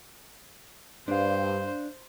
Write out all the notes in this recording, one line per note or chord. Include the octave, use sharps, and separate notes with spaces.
G2 D4 C5 F5